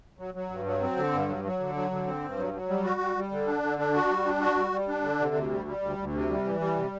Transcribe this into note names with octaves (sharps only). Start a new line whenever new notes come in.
F#3
F#3
G2
F#3
C4
D3
G2
F#3
F#3
D3
F#3
D3
C4
G2
F#3
F#3
G3
F#4
G3
G3
D3
D4
D3
D4
F#4
G3
D4
F#4
G3
G3
D4
D3
C3
D2
G3
G3
D2
D2
C3
G3
E3
G3
C3